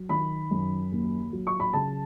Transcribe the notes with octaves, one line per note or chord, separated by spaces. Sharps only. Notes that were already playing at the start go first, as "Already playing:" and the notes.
Already playing: F#3
D#3 B5
F#2
D#2
F#3
C#6
B5
C#3 A5